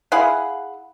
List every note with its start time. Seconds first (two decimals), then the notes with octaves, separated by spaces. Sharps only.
0.12 E4 G#4 F5 F#5